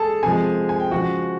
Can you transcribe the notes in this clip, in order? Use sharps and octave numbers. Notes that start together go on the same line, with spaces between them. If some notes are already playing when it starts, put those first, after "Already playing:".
Already playing: G#3 G#4 A4 A5
C3 F3 G#3 G#4 G#5
G#5
G5
C#3 F3 G#3 F#4 F#5